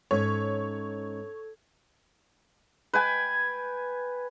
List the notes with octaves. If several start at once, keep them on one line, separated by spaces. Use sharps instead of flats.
G#2 C#4 A4 C#5 G#6
B4 G5 G#5